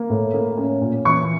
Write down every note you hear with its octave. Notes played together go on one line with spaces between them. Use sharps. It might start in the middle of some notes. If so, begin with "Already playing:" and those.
Already playing: A#3
A2
A#3
C#4
A#2
E3 C#6